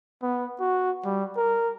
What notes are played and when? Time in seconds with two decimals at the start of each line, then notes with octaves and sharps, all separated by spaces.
0.22 B3
0.60 F#4
1.05 G3
1.36 A#4